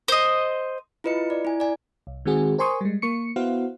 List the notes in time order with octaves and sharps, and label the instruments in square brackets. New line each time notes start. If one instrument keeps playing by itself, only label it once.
[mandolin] C5 D#5
[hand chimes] E4 F4 B4 D#5 C#7
D5
E4 G#5
D5 G#5
[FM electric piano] C2
D#3 G#3 C4 F#4 G#4
A#4 C5 G#5 C6 C#6 D#6
G3 G#3
A#3 C#6 C#7
B3 E4 F#4 C5 F5 F#5